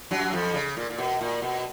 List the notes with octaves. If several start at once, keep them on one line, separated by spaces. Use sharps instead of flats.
F#2 F#3
F2 F3
C#3
A#2
A#2
B2
A#2
B2